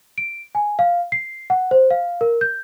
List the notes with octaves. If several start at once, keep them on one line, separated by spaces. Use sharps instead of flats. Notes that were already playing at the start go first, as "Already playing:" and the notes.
D7
G#5
F5
C7
F#5
C5
F5
A#4
G6